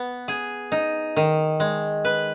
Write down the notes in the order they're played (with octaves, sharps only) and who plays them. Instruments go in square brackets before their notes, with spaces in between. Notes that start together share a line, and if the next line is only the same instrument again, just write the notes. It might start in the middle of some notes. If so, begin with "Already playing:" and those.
Already playing: [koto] B3
G#4
D#4
D#3
G#3
B4